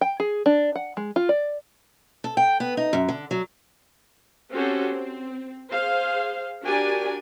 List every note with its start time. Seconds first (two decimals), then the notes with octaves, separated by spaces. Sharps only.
0.01 G5
0.20 G#4
0.46 D4
0.76 F#5
0.97 G#3
1.16 F4
1.29 D5
2.24 A4
2.37 G5
2.60 B3
2.77 D#4
2.93 F#2
3.08 D3
3.31 F#3
4.52 C4 C#4 F#4 G4 A4 C5
4.91 C4
5.70 G#4 C5 F5
6.64 D4 F#4 G4 A#4 D5 G#5